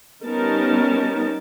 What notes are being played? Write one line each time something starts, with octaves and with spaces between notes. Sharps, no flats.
G3 B3 C#4 D#4 A#4 A5